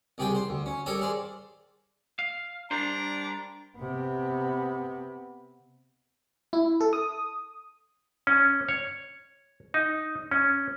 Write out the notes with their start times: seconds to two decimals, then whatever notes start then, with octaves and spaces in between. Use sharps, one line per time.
0.18 C2 C3 G#4 G5
0.35 C5
0.49 D2
0.66 C#4
0.86 G3 A4 A#4 C#5 D#6
1.01 G#4 C5 D5
2.19 F5
2.71 G3 D4 A#4 C5 A#5
3.77 C3 B3
6.53 E4
6.81 A4
6.93 D#6
8.27 C#4
8.69 C#5
9.74 D#4
10.31 C#4